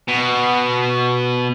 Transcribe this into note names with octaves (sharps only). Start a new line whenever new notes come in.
B2